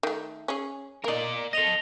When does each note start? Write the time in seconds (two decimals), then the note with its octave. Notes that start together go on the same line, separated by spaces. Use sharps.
0.03 D#3 A3
0.48 C#4 G#4
1.04 A#3 D#4 A#4 D5
1.53 A4 D#5 A#6 F7 G7